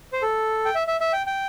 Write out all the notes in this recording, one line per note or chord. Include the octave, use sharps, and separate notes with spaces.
C5
A4
G5
E5
E5
E5
G5
G5